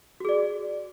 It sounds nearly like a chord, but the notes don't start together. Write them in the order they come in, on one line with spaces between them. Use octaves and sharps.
F#4 G#4 D5